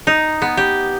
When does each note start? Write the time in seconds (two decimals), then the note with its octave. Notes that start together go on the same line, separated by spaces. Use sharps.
0.07 D#4
0.42 B3
0.57 G4